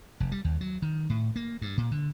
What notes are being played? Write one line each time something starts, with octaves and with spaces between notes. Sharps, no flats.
F1
G3
D#2
F#3
D#3
A2
A#3
G2
A#2
D3